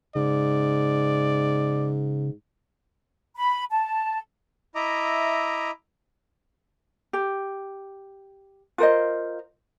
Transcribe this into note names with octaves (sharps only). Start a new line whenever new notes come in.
G#2 C#3 D5
B5
A5
E4 D#5 E5 A#5 D6
G4
F4 A#4 C5 D#5